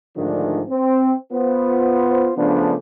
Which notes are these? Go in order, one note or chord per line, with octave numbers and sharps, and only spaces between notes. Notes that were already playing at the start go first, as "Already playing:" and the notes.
G#2 D3 D#3 F3 A3 D4
C4
B3 F4 C5
C#3 F3 A3 B3 D4